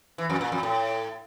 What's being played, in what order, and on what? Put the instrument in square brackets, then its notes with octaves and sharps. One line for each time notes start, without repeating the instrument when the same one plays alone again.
[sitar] E3
F2
A#2
F2
A2